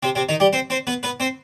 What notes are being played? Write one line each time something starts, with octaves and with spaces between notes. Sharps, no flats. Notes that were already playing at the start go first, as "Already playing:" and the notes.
C3 C4
C3 C4
D#3 D#4
G3 G4
C4 C5
C4 C5
B3 B4
B3 B4
C4 C5